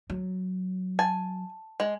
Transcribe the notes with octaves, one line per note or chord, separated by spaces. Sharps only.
F#3
G#5 A5
G#3